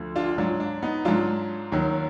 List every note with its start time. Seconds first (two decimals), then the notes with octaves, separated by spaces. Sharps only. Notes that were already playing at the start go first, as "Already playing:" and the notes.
Already playing: D2 D3 F3
0.16 D4 F4
0.38 G#2 F#3 D4 F4
0.60 D4
0.82 B3 D#4
1.05 G#2 F#3 D4 F4
1.72 D#2 D#3 F#3